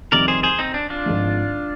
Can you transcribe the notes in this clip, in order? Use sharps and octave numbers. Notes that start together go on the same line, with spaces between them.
F2 C3 D#3 G3 A#4 D5
G#4 C5
G#4 C5
C4 D#4
D4
D4 F4
G#1 G#2 F3